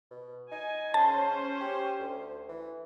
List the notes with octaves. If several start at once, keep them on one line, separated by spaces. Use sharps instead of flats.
B2
D#4 G#5
C#3 C#4 C5 A5
G4
D2
E3